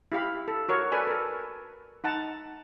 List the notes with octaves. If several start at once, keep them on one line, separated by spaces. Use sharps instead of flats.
E4 G4 F5 B5
A4
F#4 A#4 C#5
A4 B4 D5 G#5
A4 A#4
D#4 F#5 A5 A#5